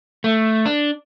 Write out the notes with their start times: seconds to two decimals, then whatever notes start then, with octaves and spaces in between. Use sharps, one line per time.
0.24 A3
0.66 D4